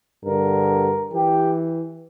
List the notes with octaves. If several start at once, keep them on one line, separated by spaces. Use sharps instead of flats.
G2 D3 A#4
E3 G4